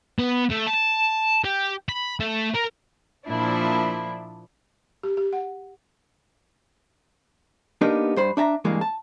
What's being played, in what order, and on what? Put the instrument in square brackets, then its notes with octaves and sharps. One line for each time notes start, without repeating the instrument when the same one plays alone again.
[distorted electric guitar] B3
A3
A5
G4
B5
A3
A#4
[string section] A#2 F3 D4 E4
[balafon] G4
G4
F#5
[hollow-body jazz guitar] A#3 B3 D4 D#4 G4 A#4
G2 C5 B5
D4 E5 A5 A#5
G2 E3 G#3 A#3
A5